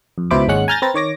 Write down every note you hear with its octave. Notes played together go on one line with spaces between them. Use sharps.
F2
C#2 B2 E4 C5 B5 D6
G#1 D#2 G#3 C#4 F#5 F#6
G#5 A#5 F6 G6 A6 A#6
C4 B4 A#5 A6
D#3 C#5 D6 A#6